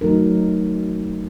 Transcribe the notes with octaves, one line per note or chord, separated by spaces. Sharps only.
F#3 A3 D#4 A#4